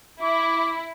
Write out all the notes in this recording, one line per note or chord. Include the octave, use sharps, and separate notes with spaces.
E4 D6